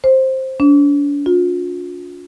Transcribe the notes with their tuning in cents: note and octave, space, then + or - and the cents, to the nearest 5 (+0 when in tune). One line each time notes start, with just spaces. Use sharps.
C5 +10
D4 -40
F4 +35